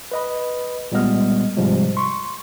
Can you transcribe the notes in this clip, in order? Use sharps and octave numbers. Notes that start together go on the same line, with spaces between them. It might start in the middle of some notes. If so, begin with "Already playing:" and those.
B4 D#5 B5
A#2 G3 G#3 B3 D#5 F6
G#2 C3 F3 G3 G#3
C6 C#6